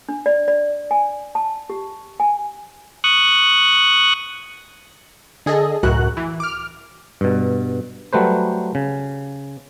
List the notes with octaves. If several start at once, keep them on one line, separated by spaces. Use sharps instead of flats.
D4
D5
D5
G#5
A5
G4
G#5
C#6 D#6 F#6
D3 G#4 A4 D#5
C#2 F#2 A2 F#4 A#4 F#6
E3
D6 F6
G2 B2
F#3 G3 A3 B4 C5
C#3